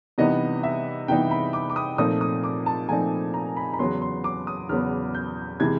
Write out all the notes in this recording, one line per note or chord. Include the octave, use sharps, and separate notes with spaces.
C3 E3 G3 B3 D#4 D#5
E5
C3 E3 G3 B3 D#4 G5
B5
D6
D6
D#6
A#2 F3 A3 C4 D#4 D#6
D#6
D6
A5
A#2 F3 A3 C4 D#4 G#5
A#5
B5
B5
E2 C#3 F#3 B3 C6
C6
D6
D#6
E2 C#3 F#3 B3 F6
G6
C3 E3 G#3 G#6